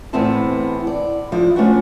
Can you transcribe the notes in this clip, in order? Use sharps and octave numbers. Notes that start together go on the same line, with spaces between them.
E2 A2 B3 C4 E4 A5
D5
D3 F3 E4
F3 A3 B3 C#4 D4 F#4